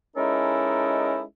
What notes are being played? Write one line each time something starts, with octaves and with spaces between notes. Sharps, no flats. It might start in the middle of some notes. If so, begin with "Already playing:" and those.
G#3 C#4 D#4 E4 A4 A#4